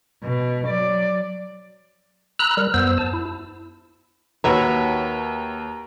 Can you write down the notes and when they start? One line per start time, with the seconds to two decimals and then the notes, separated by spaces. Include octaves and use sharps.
0.24 B2
0.68 F#3 D5
2.39 A#5 B5 E6 F#6
2.57 G3 A#4
2.74 F#2 B3 C5 E6
2.98 A5
3.13 E4
4.44 D#2 F#4 B4 C#5 E5 A#5